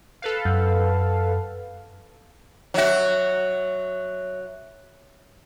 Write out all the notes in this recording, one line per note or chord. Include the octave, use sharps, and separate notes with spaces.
A4 B4 F5
F#2
F#3 F#4 C#5 E5